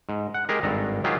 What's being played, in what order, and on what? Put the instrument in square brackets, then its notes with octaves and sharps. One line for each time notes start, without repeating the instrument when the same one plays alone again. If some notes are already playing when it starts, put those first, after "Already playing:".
[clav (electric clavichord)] G#2
F#5
G#3 G4 G#4 A#4
G#1 G2 A4 A#5
D#3 F#3 F4 G4 G#4